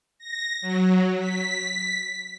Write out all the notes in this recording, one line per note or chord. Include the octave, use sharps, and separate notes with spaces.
A#6
F#3
B6